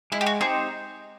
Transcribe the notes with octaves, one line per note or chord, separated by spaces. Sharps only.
G#3 E4
G4
F#4
C4 D#4 G4 G#4 C5